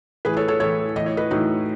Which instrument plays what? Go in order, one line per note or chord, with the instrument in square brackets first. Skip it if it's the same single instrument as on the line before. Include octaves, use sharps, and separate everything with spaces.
[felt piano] A2 E3 G#4 B4
A4 C#5
A4 C#5
A2 E3 A4 C#5
A2 E3 D#5
C#5
B4 D#5
A2 E3 D#4 F#4